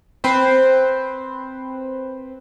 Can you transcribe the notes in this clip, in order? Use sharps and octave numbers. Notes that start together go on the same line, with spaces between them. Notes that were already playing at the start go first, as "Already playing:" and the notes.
C4 B4 C5